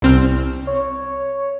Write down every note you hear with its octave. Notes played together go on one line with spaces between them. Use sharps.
C2 C4 F6
C#5